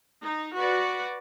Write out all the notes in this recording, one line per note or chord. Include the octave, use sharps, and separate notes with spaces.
D#4
F#4 B4 D5